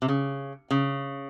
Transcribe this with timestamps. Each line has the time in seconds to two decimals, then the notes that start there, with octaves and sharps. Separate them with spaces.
0.02 C3
0.08 C#3
0.71 C#3